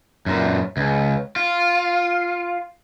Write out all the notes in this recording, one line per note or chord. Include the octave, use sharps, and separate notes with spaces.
F#2 A#2
C#2
F4